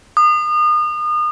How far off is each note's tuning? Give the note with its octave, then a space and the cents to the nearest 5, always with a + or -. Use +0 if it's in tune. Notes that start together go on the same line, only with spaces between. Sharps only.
D#6 -35